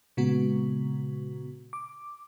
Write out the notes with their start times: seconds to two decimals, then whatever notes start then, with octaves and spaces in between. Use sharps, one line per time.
0.17 A#2 C#3 G#3 B3 F#4
1.73 D6